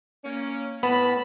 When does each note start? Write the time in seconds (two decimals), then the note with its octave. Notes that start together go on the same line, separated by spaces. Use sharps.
0.24 A#3 C#4
0.83 A2 B3 A5 B5